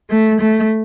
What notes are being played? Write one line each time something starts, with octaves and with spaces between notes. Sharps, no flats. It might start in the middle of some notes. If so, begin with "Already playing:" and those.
A3
A3